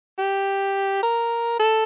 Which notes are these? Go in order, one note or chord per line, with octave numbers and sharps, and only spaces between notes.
G4
A#4
A4